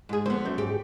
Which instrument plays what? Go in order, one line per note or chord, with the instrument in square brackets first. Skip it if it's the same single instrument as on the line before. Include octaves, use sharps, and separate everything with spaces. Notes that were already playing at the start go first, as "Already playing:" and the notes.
[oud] G#2 G#4
[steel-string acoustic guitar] D3 B3 [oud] F3 C5 [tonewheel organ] G#3
[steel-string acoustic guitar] F#2 [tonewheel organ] G6
[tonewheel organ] G#2 G#4 [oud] G4